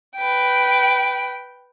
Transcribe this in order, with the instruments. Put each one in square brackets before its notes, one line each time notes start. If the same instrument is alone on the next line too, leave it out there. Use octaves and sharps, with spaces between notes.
[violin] B4 G5